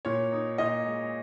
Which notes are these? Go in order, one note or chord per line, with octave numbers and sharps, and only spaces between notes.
A#2 C#5
D#4
A#2 D#5
G#3